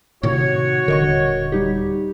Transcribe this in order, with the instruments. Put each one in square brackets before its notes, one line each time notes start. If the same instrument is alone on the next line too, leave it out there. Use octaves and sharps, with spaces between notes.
[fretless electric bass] A2 C3 D#3 [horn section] F#4 C#5
[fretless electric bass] D#1 D3 [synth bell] A#4 D#5 C#6
[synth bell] G3 D#4 G4